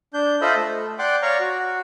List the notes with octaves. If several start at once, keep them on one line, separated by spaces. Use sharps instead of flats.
D4 G6
F4 A4 C5 D#5 E5 B5
A3
D5 F#5 G5 C6 D6
C#5 D5 F5 A#5 C#6
F#4